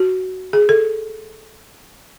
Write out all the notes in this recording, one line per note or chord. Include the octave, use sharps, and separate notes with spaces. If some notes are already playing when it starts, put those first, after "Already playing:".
Already playing: F#4
G#4
A4